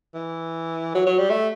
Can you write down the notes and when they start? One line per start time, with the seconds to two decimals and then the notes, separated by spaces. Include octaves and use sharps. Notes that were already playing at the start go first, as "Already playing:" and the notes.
0.15 E3
0.95 F#3
1.07 F#3
1.19 G3
1.30 A3